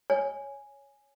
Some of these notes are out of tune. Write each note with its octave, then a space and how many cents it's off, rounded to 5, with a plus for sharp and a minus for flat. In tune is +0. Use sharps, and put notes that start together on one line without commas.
C#5 +0 G#5 +0